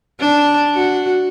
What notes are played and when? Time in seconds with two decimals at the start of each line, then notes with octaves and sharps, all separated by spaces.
0.20 D4
0.75 F#4